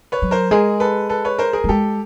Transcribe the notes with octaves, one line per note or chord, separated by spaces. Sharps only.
B4 C#5
F#3
A#4 C5
G#3 G#4 A#4
A4 B4
A4 B4
B4 C#5
A#4 C5
G#4 A#4
G3
G#3 G4 A4